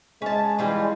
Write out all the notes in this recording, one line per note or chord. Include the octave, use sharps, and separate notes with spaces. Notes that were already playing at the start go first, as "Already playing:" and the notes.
G#3 C#4 A5
E3 G3 F4